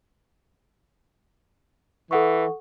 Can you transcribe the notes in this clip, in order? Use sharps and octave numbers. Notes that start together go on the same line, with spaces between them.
E3 A4 F#5 C#6